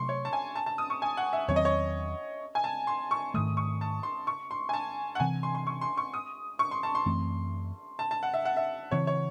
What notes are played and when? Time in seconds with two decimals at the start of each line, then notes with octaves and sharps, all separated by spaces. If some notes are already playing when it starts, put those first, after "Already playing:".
Already playing: C3 F#3 A3 C6 C#6
0.09 C#5
0.25 A5
0.33 G#5
0.56 A5
0.66 A5
0.78 D#6
0.90 C#6
1.02 G#5
1.17 F#5
1.33 E5
1.48 E2 D#3 F#3 C4 C#5
1.56 D#5
1.65 C#5
2.55 G#5
2.64 A5
2.87 C6
3.11 C#6
3.34 G#2 D#3 A3 D#6
3.57 C#6
3.81 A5
4.03 C6
4.27 C#6
4.51 C6
4.69 G#5
4.73 A5
5.15 F#5
5.20 C3 E3 C4 G#5
5.43 C6
5.55 C6
5.67 C#6
5.81 C6
5.98 C#6
6.14 D#6
6.59 C#6
6.71 C6
6.83 A5
6.95 C6
7.06 F#2 E3 A3 C4
7.99 A5
8.11 A5
8.23 F#5
8.34 E5
8.45 F#5
8.57 E5
8.91 C#3 E3 C4 C#5
9.07 C#5